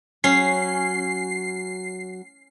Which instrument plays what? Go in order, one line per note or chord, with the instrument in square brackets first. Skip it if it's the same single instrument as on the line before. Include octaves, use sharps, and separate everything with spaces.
[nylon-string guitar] F#3 [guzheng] C#4 [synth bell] C7